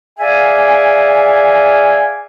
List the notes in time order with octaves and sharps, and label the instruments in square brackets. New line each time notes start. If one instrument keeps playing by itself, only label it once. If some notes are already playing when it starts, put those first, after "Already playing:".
[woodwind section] G#4 D5 E5 F5 G#5